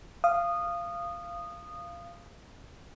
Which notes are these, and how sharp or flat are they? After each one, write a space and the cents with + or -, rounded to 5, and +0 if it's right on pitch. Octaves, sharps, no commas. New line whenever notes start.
F5 -15 D#6 -15